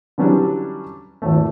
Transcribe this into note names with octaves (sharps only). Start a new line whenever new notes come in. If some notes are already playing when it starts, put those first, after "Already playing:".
D3 E3 F#3 G3 C#4 D4
G#1 E2 A3